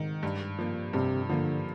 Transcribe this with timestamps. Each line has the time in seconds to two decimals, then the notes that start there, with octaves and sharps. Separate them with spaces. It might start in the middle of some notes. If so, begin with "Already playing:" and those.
Already playing: G#2 D#3
0.23 G2
0.59 F3 A#3
0.93 G2 C3
1.29 D3 F3 A#3